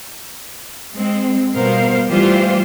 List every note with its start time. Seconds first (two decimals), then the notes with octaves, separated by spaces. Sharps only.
0.94 G#3 C4
1.55 B2 G3 B3 A#4 C5 F5
2.10 E3 G3 A3 F4 G4 C5